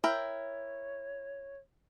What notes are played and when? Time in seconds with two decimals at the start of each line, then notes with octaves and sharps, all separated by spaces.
0.04 E4 A#4 C#5 G5